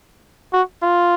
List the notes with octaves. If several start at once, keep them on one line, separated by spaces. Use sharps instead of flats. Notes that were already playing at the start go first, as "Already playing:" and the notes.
F#4
F4